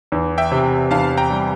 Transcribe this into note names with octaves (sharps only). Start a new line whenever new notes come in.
E2
E5 G5
C3
E2 F5 A5
G5 A#5
G3